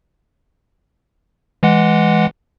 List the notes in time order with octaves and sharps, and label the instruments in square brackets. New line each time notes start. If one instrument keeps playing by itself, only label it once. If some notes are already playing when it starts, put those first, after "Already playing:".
[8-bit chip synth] E3 G#3 F#5